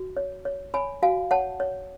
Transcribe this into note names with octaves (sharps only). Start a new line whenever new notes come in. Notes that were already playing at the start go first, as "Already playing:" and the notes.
Already playing: F#4
C#5
C#5
C#5 G#5 B5
F#4 F5 G#5
C#5 F#5 A5
C#5